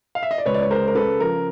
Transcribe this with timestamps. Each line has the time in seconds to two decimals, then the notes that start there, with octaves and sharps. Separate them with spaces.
0.15 F5
0.23 E5
0.31 D#5
0.38 D5
0.46 C#2 B4 C#5
0.54 D5
0.63 C#5
0.70 G#3 A#4 C5
0.88 A#4
0.95 C#3 A4 B4
1.20 F3 A#4